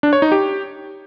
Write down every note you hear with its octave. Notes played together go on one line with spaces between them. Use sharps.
D4
C#5
D#4
G4